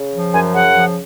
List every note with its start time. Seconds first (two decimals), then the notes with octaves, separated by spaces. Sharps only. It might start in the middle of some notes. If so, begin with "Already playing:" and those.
Already playing: C#3
0.13 F3
0.33 F#2 G#5
0.54 C#3 F#5
0.74 F3